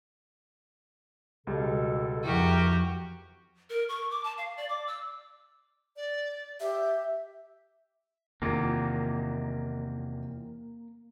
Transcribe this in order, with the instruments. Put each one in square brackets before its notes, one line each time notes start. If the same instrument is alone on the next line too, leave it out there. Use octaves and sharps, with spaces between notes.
[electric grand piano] C#2 G3 [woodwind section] B2 A4
[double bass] F2 [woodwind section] C#3 E4 A#4 [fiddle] F#4 G4
[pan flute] A#4
C#6
D6
A5
F5
D5
D6
E6
[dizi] D5
[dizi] G4 [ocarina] E5
[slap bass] E2 C3 [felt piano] D#3 F4 [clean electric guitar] A#3